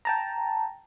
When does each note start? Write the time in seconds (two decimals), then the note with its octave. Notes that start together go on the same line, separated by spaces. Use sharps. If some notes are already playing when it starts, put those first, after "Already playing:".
0.05 G5 A5 A#5